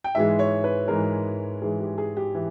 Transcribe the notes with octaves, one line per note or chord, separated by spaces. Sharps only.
G5
G#2 E3 G#3 E5
C#5
B4
G#2 E3 G#3 A#4
G#2 E3 G#3 G#4
G4
G#4
G4
E3